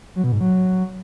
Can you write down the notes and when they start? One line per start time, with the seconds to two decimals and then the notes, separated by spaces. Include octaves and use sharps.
0.16 F#3
0.24 B2
0.32 G#2
0.40 F#3